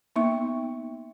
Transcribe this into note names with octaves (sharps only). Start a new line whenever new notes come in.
A#3 B3 D#4 E5 C#6